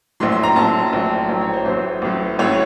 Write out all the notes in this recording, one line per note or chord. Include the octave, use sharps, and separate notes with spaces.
A#1 A2 F#3 C6
C6
A#5
A#1 A2 F#3 A5
A#1 A2 F#3
A#1 A2 F#3 G5
C#5
C5
A1 A2 F#3 C5
A1 A2 F#3
A1 A2 F#3 C#5